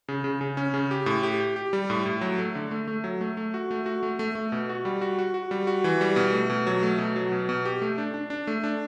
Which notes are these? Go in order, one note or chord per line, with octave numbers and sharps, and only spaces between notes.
C#3
C#3
C#3
C#4
C#3
G4
A2
G4
G4
G4
G3
A2
A2
F#3
A3
D3
A3
A3
F#3
A3
A3
F#4
A3
F#4
A3
A3
A3
B2
F#4
G3
F#4
F#4
F#4
G3
F#4
E3
G3
B2
A3
B2
F#3
A3
B2
F#3
B2
B2
G4
A3
D4
D4
D4
A3
D4